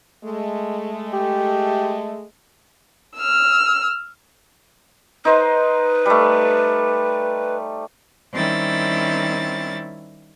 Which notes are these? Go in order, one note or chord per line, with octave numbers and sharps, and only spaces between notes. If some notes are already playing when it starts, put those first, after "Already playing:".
G#3 A3
G4
E6 F6
D#4 B4 C5
G3 A3
D#3 G3 C4 C#4 E4 A6